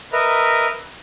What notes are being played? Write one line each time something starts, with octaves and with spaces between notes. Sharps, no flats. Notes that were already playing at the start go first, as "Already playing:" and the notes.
A#4 B4 D#5 E5 A#5